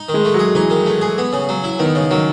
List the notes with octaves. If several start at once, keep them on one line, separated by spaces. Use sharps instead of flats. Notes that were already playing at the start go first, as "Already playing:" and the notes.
Already playing: D#4
D#3
G#3
A3
F#3
G#4
E3 D#4
D#3
A3
G#4
B3
C#3
F#3
E4
D#3 B3
C#3
D#3 F#3